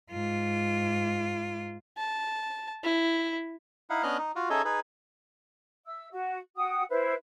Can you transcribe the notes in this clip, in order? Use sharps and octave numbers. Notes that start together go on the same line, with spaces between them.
G#2 F4
A5
E4
D#4 E4 F5 F#5
B3 C#4 D4 D#5 F6 F#6
D#4
F4 F#4
C#4 D#4 G#4 A4 D#5 E5
D#4 G#4 B4
E5 E6
F#4
F#4 F#5 G5 D#6
E4 B4 C5 E5